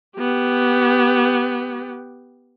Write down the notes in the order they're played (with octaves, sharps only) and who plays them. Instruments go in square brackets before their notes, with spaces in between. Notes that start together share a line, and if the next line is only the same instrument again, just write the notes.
[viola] B3 G4